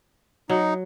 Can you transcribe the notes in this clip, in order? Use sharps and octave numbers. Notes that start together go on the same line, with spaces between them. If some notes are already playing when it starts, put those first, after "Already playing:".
F#3 D#4